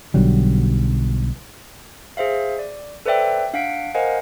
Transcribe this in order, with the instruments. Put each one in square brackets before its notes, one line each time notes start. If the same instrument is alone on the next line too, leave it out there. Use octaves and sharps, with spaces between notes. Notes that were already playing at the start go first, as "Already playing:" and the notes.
[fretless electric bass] B1 D3 F#3 G3
[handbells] G#4 C5 E5 F5
D5
A4 B4 C5 D5 E5 G5
D4 F5 F#5 B6 D7
A#4 C5 D#5 F5 F#5 G#5